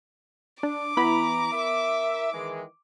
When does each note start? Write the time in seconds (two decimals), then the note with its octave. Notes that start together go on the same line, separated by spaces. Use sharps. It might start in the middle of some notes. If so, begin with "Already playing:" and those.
0.63 D4 D6
0.97 E3 B3 E4 A#5 B5
1.52 A#4 E5
2.33 D#3 E3 G#3